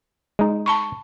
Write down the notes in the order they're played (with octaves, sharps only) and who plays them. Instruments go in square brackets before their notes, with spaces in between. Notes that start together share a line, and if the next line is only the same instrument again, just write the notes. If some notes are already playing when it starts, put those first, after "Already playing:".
[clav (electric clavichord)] G#3 D#4
[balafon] A5 B5 C#6